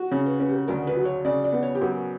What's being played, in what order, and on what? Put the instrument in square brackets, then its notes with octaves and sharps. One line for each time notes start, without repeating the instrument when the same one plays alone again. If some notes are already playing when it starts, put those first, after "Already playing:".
Already playing: [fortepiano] F#4
[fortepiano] C#3 [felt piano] C#5
[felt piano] B4
[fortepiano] C#4 [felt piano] B4
[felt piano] G4
A#4
[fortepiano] D2 [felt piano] A#4
[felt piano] B4
[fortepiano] F#3
[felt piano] C#5
[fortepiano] C#3 [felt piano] D5
[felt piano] D5
[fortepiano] B3
[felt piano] C#5
G4
[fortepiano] F#2 [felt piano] A#4